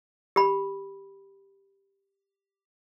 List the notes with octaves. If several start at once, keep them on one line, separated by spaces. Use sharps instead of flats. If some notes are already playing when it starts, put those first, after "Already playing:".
G4 B5